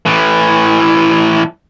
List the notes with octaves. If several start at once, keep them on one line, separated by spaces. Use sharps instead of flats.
A2 E3